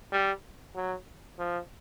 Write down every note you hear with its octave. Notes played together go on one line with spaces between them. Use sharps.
G3
F#3
F3